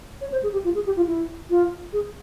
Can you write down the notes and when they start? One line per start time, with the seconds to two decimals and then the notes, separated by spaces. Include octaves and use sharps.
0.21 C#5
0.32 C5
0.43 G#4
0.53 G4
0.64 F4
0.75 G#4
0.86 G4
0.97 F4
1.07 E4
1.50 F4
1.93 G#4